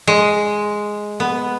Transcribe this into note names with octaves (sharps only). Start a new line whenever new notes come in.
G#3
B3